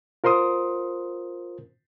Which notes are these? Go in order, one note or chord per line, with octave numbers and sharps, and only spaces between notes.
F4 A#4 C5 C6 D#6